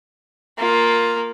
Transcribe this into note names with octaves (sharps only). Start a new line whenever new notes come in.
A#3 F4